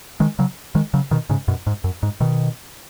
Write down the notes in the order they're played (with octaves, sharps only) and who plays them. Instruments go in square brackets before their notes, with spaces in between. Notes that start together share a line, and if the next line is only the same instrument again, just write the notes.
[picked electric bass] D#3 G#3
C#3 F#3
D#3 G#3
C#3 F#3
B2 D#3
G#2 C#3
F#2 B2
G#2
F#2
G#2
B2 D#3